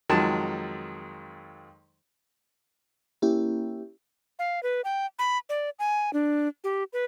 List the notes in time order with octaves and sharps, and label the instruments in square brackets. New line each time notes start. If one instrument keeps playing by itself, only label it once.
[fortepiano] F2 D#3 F#3 G#3 A5
[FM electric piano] A#3 C#4 E4 G4
[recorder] F5
B4
G5
B5
D5
G#5
D4
G4
B4